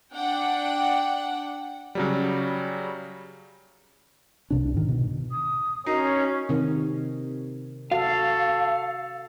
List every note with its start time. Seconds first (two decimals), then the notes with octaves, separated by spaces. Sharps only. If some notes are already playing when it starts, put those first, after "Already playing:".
0.13 D4 F#5 G5
1.95 C#3 F#3 G3
4.50 C2 C3 D4
4.74 G#2 D#3
4.88 B2
5.31 D#6
5.86 C#4 D#4 F#4 A#4 A#5 C7
6.49 C3 D#3
7.92 F#4 A4 F5